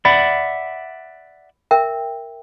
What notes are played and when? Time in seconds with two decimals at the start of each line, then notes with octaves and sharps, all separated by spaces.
0.05 D5 E5 F#5 B5
1.71 A#4 E5 G5